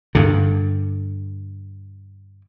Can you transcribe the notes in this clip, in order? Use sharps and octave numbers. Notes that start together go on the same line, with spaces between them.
G2 D3